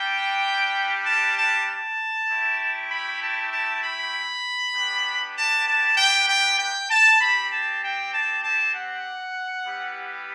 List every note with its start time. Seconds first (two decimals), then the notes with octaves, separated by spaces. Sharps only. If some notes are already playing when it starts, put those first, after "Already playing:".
Already playing: G3 D4 G4 G5
1.06 A5
1.37 A5
1.67 A5
2.28 A3 E4 G4
2.90 B5
3.20 A5
3.51 A5
3.82 B5
4.74 B3 D4 G4
5.36 A5
5.66 A5
5.97 G5
6.28 G5
6.58 G5
6.90 A5
7.20 C4 G4 B5
7.51 A5
7.82 G5
8.12 A5
8.43 A5
8.74 F#5
9.66 G3 B3 E4 G4